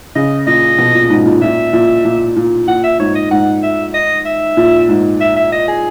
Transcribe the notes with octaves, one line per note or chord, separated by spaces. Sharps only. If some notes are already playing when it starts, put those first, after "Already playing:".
C#3 D#5
A#2 D#5
B2
A#2
G#2
A#2
A#2 E5
A#2
A#2
A#2
A#2 F#5
E5
G#2 C#5
D#5
G#2 F#5
E5
D#5
E5
A#2
G#2
E5
E5
D#5
G#4